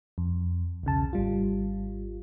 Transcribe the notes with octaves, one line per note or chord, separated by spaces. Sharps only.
F2
B1 E2 C#3 A5
G#1 G3 F4